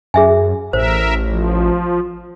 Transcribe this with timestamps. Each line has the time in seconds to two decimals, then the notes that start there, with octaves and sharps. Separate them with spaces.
0.14 F#2 G#4 E5 G#5
0.73 A1 A#4 C5 E5
1.28 F3